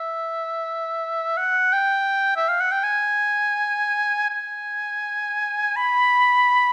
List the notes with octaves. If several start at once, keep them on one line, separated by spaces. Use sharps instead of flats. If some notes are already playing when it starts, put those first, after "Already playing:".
Already playing: E5
F#5
G5
E5
F5
F#5
G5
G#5
G#5
B5